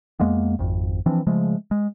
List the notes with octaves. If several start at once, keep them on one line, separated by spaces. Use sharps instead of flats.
F2 G#3 A#3 B3
G#1 F2
E3 F3 C4 D4
C#3 F3 G#3 A3
G#3